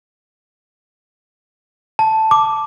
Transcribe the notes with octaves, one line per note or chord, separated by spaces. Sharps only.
A5
D6